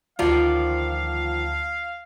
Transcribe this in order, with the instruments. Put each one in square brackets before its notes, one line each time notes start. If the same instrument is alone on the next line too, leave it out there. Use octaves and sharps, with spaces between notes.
[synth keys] D2 F#5 A5 [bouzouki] D#3 F3 D5 [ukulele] F4 [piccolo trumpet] F5